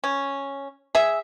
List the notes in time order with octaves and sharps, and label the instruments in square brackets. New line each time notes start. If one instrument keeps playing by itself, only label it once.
[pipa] C#4
G#4 E5